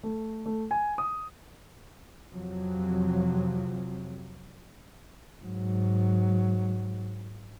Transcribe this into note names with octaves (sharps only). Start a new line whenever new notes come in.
A3
A3
G#5
D#6
F2 C3 F3 F#3
G#2 F#3